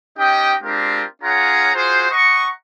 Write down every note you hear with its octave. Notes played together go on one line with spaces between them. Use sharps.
C#4 D#4 G4 D#5 G5
G#3 C4 D4 F4 G4 A#4
C#4 F4 G#4 C#5 F#5 A#5
F4 F#4 G#4 C5
D#5 F#5 A#5 C#6